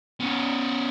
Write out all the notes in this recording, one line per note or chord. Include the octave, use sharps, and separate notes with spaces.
B3 C#4